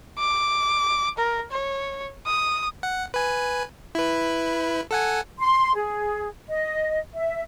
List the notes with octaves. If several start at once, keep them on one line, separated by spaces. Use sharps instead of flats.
D6
A#4
C#5
D#6
F#5
B4 G#5
E4 B4
A4 F#5 G#5
C6
G#4
D#5
E5